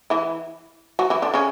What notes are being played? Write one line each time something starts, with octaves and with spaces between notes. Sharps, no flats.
E3 E4
F#3 F#4
E3 E4
D3 D4
C#3 C#4